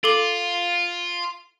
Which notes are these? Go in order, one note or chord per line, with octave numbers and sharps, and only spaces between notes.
F4 A4 D6 G7